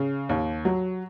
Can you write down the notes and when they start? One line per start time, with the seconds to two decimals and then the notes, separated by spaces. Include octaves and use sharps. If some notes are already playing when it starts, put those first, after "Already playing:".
Already playing: C#3
0.29 D#2
0.65 F#3